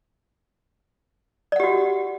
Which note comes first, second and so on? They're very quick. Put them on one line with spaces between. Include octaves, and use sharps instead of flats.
D5 F#5 G4 F#4